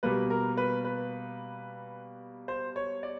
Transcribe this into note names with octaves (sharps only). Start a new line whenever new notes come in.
B2 G3 A#3 B4
A#4
B4
B4
C5
C#5
D5